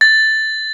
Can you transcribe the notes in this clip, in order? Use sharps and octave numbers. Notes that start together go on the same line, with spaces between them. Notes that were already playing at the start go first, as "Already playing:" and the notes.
A6